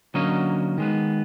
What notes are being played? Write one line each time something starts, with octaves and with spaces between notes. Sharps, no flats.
D3 F#3 A#3 C#4 D#5
D#3 G#3 B3